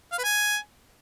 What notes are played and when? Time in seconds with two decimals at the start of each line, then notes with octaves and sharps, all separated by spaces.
0.12 F5
0.18 B4
0.24 G#5